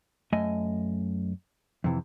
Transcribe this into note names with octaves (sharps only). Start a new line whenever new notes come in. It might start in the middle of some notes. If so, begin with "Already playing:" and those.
F#2 A3 D#5 G#5
F2 C3 E3